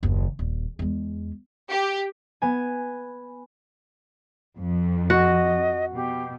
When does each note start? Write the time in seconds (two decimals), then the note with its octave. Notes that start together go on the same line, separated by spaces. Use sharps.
0.03 F#1 D#2
0.39 D#1
0.79 E2 G#3
1.70 G4
2.42 B3 G#5
4.57 F2
5.10 F#4 D#5
5.95 B2 G4